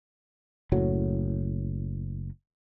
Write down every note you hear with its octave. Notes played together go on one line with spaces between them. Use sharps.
F#1 A2 F#3